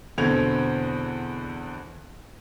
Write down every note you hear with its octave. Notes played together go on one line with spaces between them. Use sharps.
E2 B2 D3 C4 G#6 F7